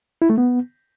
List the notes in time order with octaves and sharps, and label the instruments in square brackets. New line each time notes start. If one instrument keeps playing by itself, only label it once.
[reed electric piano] E4
A3
B3